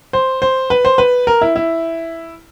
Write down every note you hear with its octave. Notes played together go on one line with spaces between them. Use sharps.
C5
C5
B4
C5
B4
A#4
E4
E4